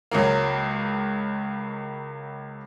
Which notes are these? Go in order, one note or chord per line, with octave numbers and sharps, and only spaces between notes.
C#2 F#3 A#3